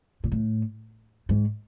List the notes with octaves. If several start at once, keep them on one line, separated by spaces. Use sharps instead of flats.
A#2
A2
G#2